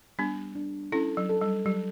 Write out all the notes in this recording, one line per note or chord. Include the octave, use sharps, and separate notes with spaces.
G3 B3 D4
D4
C#4 E4 A4
F#3
A4
G3
F#3 G3